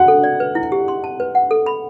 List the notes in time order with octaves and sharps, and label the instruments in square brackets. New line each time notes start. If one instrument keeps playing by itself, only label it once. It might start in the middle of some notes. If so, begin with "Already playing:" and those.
Already playing: [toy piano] F#4 [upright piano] F#5
[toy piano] A4
D5
B4
E4
G4
C6
A5
B4
F#5
A4
B5